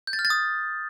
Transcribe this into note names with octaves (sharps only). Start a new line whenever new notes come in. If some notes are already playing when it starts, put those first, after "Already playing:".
G6
A6
F6
A6
D#6